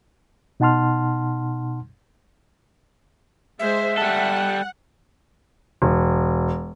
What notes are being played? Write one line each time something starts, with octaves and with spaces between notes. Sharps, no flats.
B2 D#4 F#5 A5 C6 F6
G#3 C5 E5
G3 A4 F#5
E1